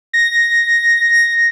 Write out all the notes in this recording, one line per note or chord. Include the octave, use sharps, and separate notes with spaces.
A#6